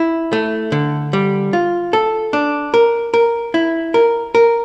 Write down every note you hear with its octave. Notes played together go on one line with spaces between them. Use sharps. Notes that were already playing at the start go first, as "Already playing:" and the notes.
Already playing: E4
A3
D3
G3
F4
A4
D4
A#4
A#4
E4
A#4
A#4